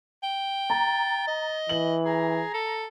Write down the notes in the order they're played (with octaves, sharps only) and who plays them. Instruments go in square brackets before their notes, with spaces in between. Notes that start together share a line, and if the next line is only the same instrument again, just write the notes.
[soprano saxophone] G5
[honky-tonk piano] A#5 [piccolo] A6
[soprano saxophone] D#5
[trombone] E3 [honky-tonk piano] F#7
[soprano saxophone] G#4 [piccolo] A#5
[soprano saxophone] A4